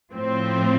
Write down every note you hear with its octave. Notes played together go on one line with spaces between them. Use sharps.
A2 F3 C4